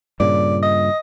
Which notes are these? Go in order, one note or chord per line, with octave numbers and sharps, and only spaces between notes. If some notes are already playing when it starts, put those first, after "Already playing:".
G2 A#2 C#3 D5
D#5